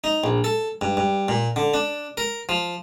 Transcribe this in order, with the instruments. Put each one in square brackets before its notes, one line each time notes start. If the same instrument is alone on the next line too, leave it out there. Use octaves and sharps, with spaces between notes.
[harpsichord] D#4
A#1
A4
G2
G2
A#2
D3
D4
A#4
F3